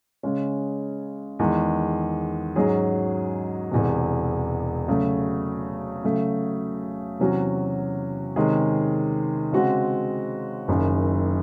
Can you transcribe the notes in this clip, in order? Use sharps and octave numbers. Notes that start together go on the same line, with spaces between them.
C#3 G#3 C#4
E2 D#3 G#3
G#2 F#3 C#4 G#4
E1 E2 C3
C#3 F#3 A3
C#3 F#3 A3
E2 C3 F#3 C#4 F#4
C3 D#3 G#3 C#4 G#4
C#3 G#3 C4 F#4
F#1 F#2 D#3